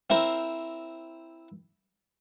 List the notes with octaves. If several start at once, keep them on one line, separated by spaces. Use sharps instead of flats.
C4 E4 A#4 C5